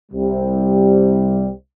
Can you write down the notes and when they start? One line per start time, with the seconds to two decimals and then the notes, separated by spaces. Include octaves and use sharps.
0.12 C2 C3 G3